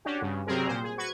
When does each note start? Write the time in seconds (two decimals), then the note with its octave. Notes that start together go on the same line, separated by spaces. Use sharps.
0.05 C#4 D4 F#4 G4
0.21 G2 C#3
0.47 C3 F#3 G3 C4 G#4 A#4
0.67 A#2 C5
0.84 G#4
0.98 F#4 B4 C#6 G#6